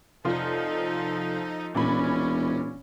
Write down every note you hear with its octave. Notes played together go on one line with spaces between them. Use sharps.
F1 F3 D#4 F4 A4
E1 A#2 C#4 B5